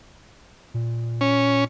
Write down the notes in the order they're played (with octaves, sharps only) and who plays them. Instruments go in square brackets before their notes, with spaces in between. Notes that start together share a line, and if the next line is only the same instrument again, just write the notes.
[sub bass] A#2
[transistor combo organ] C#4